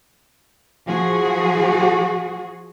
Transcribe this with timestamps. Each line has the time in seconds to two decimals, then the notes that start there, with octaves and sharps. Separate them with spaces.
0.87 F3 F#4 G#4